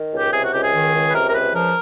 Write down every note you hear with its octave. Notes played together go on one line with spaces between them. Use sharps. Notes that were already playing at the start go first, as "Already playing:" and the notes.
Already playing: D#3
C#2
G4
C3 G#4
F#4
C#2 G4
G#4
D#3
C#2
B4
C3 A#4
A#4
C#2 B4
F3 A#4